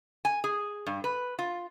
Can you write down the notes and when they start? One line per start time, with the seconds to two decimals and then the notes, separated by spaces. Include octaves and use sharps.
0.25 G#5
0.44 G#4
0.87 G2
1.04 B4
1.39 F4